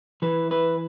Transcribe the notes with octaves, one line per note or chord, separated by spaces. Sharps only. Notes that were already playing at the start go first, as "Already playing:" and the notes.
E3 B4
B4